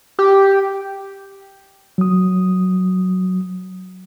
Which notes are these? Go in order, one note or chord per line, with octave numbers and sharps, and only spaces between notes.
G4
F#3 D#6